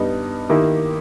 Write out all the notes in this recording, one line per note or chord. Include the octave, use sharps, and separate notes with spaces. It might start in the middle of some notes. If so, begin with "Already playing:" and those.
Already playing: G2 G3 B3 D#4
D#3 A#3 E4 G4